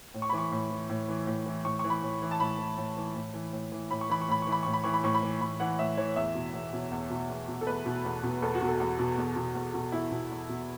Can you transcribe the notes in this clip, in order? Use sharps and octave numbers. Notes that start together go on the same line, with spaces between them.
A2
C#6
B5
E3
C#6
A2
E3
A2
E3
A2
E3
A2 C#6
C#6
E3
B5
A2
E3
A5
A2 B5
E3
A2
E3
A2
E3
A2
E3
A2 B5
C#6
E3 B5
C#6
A2 B5
E3 C#6
B5
A2 C#6
B5
E3 C#6
B5
A2 C#6
B5
E3
A2 B5
E3 F#5
A2 E5
E3 C#5
E2 E5
B2
E2
B2
E2
B2
E2
B2
A4
E2 B4
B2
E2
B2
E2 A4
F#4
B2
A4
E2
B2
E2
B2
E2
B2
E2 E4
B2
E2
B2